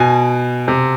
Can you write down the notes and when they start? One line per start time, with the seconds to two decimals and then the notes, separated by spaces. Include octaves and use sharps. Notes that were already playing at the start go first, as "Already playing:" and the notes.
Already playing: B2 G#5
0.68 C3